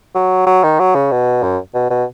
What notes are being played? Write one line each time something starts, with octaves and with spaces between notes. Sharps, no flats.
F#3
F#3
D#3
F#3
C#3
B2
F#2
B2
B2